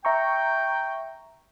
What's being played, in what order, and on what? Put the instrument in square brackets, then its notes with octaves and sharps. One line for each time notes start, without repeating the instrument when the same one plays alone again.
[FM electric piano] E5 A#5 C#6 [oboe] G5